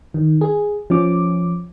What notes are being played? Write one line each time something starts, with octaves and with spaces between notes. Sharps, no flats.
D#3
G#4
F3 C#4 D6